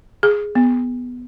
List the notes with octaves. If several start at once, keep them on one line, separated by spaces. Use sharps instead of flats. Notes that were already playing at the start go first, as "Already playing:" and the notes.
G#4
B3